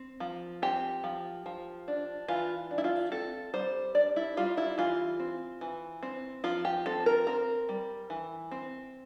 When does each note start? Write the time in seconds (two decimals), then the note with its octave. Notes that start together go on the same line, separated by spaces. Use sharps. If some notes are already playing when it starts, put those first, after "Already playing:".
Already playing: C4
0.20 F3
0.62 C4 G4
1.04 F3
1.46 F3
1.88 D4
2.28 E3 F4
2.71 D4
2.78 E4
2.84 F4
3.12 C4 A4
3.54 G3 C5
3.95 D4 D5
4.16 E4
4.37 G3 F4
4.57 E4
4.78 E3 F4
5.20 C4
5.61 E3
6.03 C4
6.44 F3 F4
6.65 G4
6.86 C4 A4
7.06 A#4
7.27 C4 A#4
7.69 G3
8.10 E3
8.51 C4